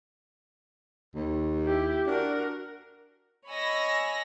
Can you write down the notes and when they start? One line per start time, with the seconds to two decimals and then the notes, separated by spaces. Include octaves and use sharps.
1.15 D#2
1.66 E4 G4
2.06 D4 F#4 A#4
3.51 C#5 D#5 G#5 B5 E6 A#6